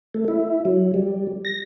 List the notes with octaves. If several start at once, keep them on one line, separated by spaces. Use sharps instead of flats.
A3
E4
F#3
G3
A#6